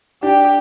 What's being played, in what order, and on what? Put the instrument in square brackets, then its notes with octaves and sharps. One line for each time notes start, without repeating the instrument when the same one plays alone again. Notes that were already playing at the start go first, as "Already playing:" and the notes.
[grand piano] D4 [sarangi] G4